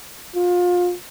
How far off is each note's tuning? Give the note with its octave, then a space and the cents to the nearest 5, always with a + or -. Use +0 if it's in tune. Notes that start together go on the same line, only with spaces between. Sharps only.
F4 +25